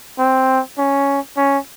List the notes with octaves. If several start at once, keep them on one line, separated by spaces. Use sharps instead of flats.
C4
C#4
C#4